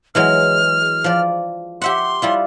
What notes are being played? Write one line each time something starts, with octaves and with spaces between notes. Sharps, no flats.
E3 F#3 G#3 F6
F3 D5
G4 E5 F#5 C6
G3 E4 F4